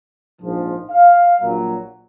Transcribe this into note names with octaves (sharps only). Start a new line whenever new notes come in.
A#1 G#2 F3
F5
A#1 A#2 F#3